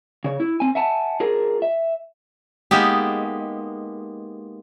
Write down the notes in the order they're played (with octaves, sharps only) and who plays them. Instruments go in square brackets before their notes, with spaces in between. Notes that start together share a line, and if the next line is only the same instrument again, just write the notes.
[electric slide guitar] C#3 C#5
E4
C4 G#5
E5 F#5 G#5 A5
F4 G#4 A#4
E5
[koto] G#3 A#3 B3 D#4 G4